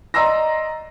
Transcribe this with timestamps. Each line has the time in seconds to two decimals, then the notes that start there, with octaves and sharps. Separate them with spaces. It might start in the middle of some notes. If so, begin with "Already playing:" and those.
0.14 D5 D#5 A#5 C6 E6 A#6